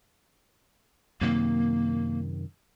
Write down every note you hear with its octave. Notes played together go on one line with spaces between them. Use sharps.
F#2 C3 D#3 A#3